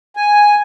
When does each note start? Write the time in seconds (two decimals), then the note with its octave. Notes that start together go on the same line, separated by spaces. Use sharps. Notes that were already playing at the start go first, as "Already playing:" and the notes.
0.17 G#5